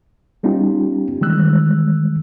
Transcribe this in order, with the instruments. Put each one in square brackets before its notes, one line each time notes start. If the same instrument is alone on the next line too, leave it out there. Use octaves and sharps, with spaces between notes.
[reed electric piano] G3 B3 C#4 D#4 F4 G4
D#3 E3 G3 G#3 E6 F#6